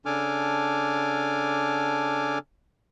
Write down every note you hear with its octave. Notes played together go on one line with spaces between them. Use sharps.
C#3 D4 A4 G#5 D6 F6